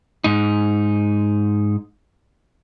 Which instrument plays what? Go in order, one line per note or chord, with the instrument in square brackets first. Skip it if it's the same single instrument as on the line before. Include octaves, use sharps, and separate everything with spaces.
[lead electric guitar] G#2 D#4